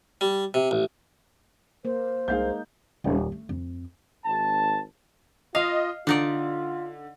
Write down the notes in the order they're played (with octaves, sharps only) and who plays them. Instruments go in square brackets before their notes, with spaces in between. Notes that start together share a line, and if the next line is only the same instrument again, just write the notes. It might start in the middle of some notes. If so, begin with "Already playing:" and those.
[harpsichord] G3
C3
A1
[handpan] A#3 [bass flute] C5
[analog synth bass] C2 [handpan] G#3 A#3 D#4 [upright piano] G#4 F5 G6
[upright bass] D#1
A3
F2
[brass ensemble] G#1 A5
[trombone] F4 [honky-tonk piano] D#5 [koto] F5
[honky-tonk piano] D3 [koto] D4 D#4 D5 [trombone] F4